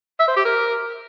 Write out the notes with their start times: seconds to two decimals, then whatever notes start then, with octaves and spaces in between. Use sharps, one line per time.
0.20 E5
0.28 C5
0.36 G4
0.45 A#4